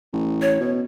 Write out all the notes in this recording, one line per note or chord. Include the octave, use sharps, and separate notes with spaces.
A1
C#5
B2